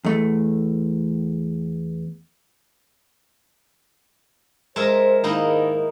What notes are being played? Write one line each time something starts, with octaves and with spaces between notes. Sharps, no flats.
E2 A3
G#3 A#4 C5 E5
G#2 D#3 A#3 D#4 E4